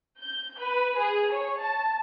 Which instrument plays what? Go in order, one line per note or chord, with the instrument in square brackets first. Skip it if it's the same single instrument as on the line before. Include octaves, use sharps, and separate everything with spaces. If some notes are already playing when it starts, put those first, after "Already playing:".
[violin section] G6
B4
G#4
C#5
A5